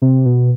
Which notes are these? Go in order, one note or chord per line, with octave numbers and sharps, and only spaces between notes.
C3
B2